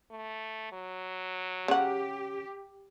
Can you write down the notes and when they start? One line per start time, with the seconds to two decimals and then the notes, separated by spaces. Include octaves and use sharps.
0.11 A3
0.72 F#3
1.68 C#3 G4 F#5